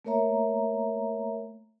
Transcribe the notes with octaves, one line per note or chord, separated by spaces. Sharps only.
A3 A#3 A#4 C#5 E5 A#5